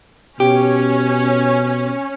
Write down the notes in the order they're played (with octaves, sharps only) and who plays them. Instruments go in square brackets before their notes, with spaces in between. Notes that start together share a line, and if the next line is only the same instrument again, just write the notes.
[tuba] B2 [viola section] C#4 [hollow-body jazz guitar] G4